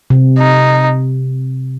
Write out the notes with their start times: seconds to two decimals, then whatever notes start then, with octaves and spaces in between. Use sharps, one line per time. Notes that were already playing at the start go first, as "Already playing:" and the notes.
0.10 C3
0.37 D#4